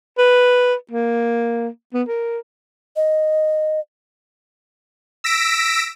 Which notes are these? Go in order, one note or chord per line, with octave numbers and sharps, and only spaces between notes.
B4
A#3
B3
A#4
D#5
E6 A#6 B6 D7